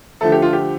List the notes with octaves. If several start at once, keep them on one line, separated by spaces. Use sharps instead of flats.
D3 F3 A3 A4
G4
F4
G4